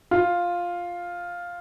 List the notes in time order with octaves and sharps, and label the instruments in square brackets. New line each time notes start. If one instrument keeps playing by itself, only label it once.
[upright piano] F4